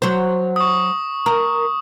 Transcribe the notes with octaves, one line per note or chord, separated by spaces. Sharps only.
F#3 C5
C#6 D#6
A#4